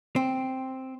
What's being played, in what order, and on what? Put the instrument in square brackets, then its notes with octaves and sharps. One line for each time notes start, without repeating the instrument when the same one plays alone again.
[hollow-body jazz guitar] C4